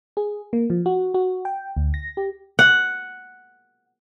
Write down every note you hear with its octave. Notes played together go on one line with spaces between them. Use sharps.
G#4
A#3
F3
F#4
F#4
G5
D2
A#6
G4
F#5